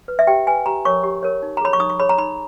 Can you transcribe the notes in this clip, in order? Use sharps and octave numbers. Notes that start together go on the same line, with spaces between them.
B4
E5
G4 G5
B4 G#5
G4 A#5
A#4 C#5 C#6
G4
A#4 C#5
D#4
A#5
G#4 C#5 B5
C#6
D#4 D#6
C#6
G#4 C#5 B5
A#5
D#4 B5